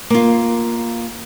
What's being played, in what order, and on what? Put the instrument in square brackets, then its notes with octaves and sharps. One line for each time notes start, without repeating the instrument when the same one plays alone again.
[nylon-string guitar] A#3 F4